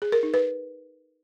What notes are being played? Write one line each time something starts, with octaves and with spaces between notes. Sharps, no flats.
G#4
A#4
D#4
B4